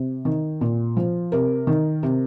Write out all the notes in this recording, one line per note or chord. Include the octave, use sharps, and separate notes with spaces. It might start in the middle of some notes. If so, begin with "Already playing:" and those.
Already playing: C3
D#3
A#2
F3
C3 A#4
D#3
C3